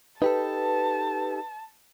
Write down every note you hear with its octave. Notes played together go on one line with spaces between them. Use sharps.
D#4 G4 A4 B4 A5